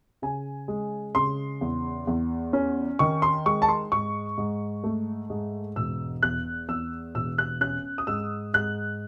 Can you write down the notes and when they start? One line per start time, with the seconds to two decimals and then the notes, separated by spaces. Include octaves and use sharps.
0.22 C#3 G#5
0.68 G#3
1.15 C#3 C6
1.61 E2
2.07 E2
2.53 C#4
2.99 D#3 C#6
3.22 C6
3.46 G#3 C#6
3.62 A5
3.69 C6
3.92 G#2 C#6
4.38 G#2
4.84 A3
5.30 G#2
5.76 E1 E6
6.23 E2 F#6
6.68 E2 E6
7.15 E1 E6
7.38 F#6
7.61 C#4 F#6
7.98 D#6
8.07 G#2 E6
8.54 G#2 F#6